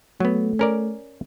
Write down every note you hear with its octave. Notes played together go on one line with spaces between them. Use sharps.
F#3 A3 B3
C#4 A#4 D5